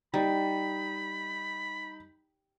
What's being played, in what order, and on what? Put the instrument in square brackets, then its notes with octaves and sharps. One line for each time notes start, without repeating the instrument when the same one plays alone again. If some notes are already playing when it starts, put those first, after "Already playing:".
[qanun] G3 [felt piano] D#4 [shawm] B5